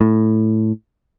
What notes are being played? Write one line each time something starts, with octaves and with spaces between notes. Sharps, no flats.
A2